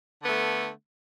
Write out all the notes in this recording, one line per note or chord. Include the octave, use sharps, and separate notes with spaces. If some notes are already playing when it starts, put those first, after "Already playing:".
D3 A3 B3